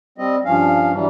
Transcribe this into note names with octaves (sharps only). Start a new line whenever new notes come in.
G3 C4 D#5
G2 F3 C#4 F5
G2 E3 F#3 G3